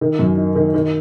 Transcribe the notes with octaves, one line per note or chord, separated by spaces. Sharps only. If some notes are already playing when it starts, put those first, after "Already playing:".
D#3
F#2
D#4
D#3
D#3